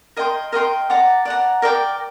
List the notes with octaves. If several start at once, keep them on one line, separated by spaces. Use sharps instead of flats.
A#4 D#5 G5 C6
A#4 D#5 G5 C6
D5 F#5 A#5
D5 F#5 A#5
A#4 D5 G5 D6